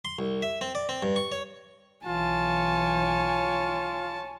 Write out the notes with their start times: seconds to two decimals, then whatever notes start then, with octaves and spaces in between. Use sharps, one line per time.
0.05 C6
0.19 C2
0.42 E5
0.61 C4
0.75 D5
0.89 C4
1.03 G2
1.16 C#6
1.32 C#5
2.06 B1 E3 F4 C#5 G#5 A5